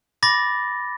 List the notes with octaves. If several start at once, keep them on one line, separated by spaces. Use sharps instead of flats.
B5 D6 A6 A#6